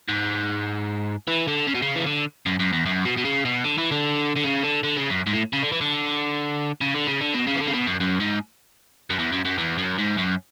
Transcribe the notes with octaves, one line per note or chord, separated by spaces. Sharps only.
G#2
E3
D3
C#3
B2
C#3
E3
D3
F#2
F#2
E2
F#2
B2
B2
C#3
B2
D3
E3
D3
D3
C#3
D3
D3
C#3
F#2
G#2
A2
C#3
D3
E3
D3
C#3
D3
C#3
D3
B2
C#3
E3
D3
C#3
B2
F#2
F#2
G#2
F#2
E2
F#2
F#2
E2
F#2
G#2
F#2